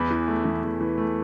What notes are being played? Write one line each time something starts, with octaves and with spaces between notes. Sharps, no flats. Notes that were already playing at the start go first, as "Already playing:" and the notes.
Already playing: E2 B5
E3
A3
E2
E2
E3
A3